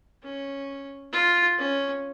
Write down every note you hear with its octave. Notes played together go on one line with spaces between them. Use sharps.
C#4
F4
C#4